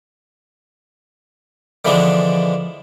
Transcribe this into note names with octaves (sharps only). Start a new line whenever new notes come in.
D3 E3 F3 G#3 B3 D4